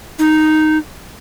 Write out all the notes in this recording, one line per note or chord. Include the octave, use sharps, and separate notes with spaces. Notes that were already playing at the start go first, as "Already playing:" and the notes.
D#4